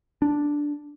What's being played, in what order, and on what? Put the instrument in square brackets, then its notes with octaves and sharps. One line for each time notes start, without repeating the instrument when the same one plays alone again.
[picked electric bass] D4